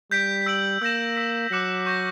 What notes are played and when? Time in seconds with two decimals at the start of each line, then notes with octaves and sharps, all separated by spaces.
0.11 G3 G6 B6 D7
0.46 E6 B6 D7 F#7
0.82 A#3 E6 G6 A#6 E7
1.16 E6 B6 D7
1.51 F#3 D6 F#6 C#7 F#7
1.86 C#6 G6 A#6